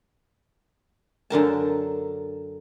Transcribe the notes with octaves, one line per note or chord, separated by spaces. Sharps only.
F#2 D3 A#4 A5